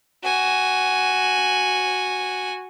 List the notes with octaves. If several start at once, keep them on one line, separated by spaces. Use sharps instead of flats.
F#4 G#5